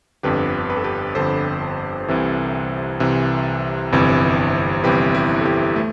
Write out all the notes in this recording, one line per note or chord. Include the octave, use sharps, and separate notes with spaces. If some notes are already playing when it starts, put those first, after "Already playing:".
G1 F2 D3 G4 B4
B4
A4
G4 B4
G1 F2 D3 A4 C5
C2 C3 E3
C2 C3 E3
G1 F2 C3 E3
G1 F2 C3 E3 G4 B4
E4 G4
A4
E4 G4
A3